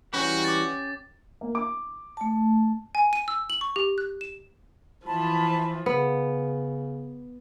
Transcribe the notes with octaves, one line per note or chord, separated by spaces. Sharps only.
E3 G3 C#4 F#4 G4 B4 C#5
D6 A6
A#3
D6
A3 A5
G#5
D#7
E6
F#7
C#6
G4
F#6
E7
E3 F3 A5 B5
C#3 B3